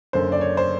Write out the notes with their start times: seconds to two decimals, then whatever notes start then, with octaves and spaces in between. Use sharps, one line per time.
0.13 F#1 F#2 D3 C5
0.32 D5
0.41 C#5
0.57 C5